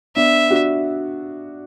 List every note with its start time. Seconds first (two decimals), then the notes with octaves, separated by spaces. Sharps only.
0.16 B3 D4 E5
0.51 D4 F#4